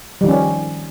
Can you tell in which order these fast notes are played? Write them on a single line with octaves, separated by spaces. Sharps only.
G3 D#3 F3 C#4